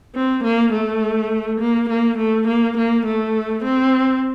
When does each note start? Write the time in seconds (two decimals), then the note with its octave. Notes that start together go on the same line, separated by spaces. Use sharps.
0.15 C4
0.44 A#3
0.73 A3
1.60 A#3
1.89 A#3
2.18 A3
2.48 A#3
2.78 A#3
3.06 A3
3.64 C4